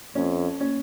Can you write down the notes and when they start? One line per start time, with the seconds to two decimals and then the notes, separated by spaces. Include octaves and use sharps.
0.15 F2 C#4
0.60 C#4